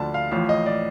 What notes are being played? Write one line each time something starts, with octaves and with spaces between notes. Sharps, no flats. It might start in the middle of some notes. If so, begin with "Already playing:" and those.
Already playing: D2 D3 F3 A5
F5
A1 A2 F3 F5
D#5
D5